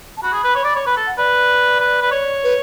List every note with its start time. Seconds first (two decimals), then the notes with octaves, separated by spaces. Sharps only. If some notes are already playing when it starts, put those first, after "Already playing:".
0.17 A5
0.23 F#4 B5
0.33 G#4
0.44 B4
0.55 C#5
0.65 D5
0.75 C#5
0.86 B4 B5
0.97 A4
1.07 F#5
1.18 B4 D5
1.80 B4
2.01 B4
2.12 C#5
2.44 B4